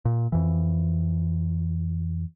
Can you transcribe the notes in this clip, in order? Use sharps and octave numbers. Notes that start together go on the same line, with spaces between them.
A#2
F2 E3